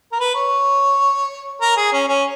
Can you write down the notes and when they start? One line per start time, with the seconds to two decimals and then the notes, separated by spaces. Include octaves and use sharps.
0.12 A#4
0.20 B4
0.35 C#5
1.61 A#4
1.77 G#4
1.92 C#4
2.08 C#4